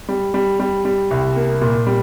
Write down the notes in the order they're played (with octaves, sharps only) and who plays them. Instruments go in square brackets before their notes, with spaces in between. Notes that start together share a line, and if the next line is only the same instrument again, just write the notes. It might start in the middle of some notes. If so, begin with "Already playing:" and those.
[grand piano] G3
G3
G3
G3
C2
A#3
A#2
G3